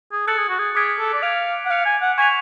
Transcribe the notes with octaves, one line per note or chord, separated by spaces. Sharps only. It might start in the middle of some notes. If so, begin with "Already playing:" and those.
G#4
A4 F#6 A6 C#7 F#7
G#4
F#4
G#4
G#4 D6 F6 G#6 B6 D7
A4
D5
F5 G#6 D7 F7
F#5
F5 F#6 C#7 F7
G#5
F#5
G#5 C#6 G#6 B6 F7